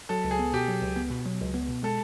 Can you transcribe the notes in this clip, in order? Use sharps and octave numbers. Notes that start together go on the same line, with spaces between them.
F#3 A4
C#2
G#4
B3
B2 G4
F#3
C#2
B3
B2
F#3
C#2
B3
B2
G#3 A4